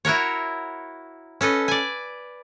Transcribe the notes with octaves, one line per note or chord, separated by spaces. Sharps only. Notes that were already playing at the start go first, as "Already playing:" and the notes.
E4 F#4 A#4 C#5
C#4 A4 B4 D#5
D5 G#5